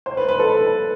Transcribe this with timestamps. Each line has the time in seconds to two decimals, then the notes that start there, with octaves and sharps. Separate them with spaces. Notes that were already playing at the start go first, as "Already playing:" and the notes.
0.06 C5
0.17 B4
0.29 B4
0.39 A4